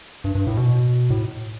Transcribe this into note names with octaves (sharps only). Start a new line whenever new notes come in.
G2
G2
A2
B2
A2